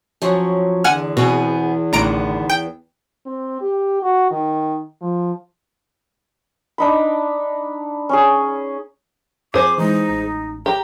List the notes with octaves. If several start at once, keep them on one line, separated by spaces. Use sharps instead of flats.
F3 F#3 C#4
E2 D3 F#5 G#5 F6
B2 B3 C4 G#4
A1 D3 D#3 B3 A#5 D7
G5
C4
G4
F#4
D#3
F3
D4 D#4 B5
C#4 G#4
F2 G#4 C5 D6
E3 G#3 D#4
A1
G4 A#5